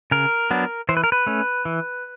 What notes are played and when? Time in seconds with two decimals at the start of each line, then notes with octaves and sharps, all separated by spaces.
0.11 C#3 A#4
0.51 F#3 B3 D4
0.89 E3 C5
0.97 B4
1.04 A#4
1.12 B4
1.27 A3 C#4
1.65 E3